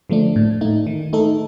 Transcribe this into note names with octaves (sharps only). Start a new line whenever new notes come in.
D3 F3 A3 D4
A2
A3 D#4
D#3
A3 D#4 A4